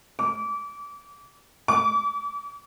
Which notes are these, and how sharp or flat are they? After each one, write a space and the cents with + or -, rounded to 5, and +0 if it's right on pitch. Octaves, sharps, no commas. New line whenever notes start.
D6 -35
D6 -40